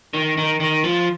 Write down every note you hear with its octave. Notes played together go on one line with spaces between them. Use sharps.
D#3
D#3
D#3
F3